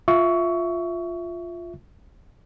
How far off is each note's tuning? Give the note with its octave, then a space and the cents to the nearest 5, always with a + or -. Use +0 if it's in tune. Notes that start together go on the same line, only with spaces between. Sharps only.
F4 +0 E5 +0 C#6 +20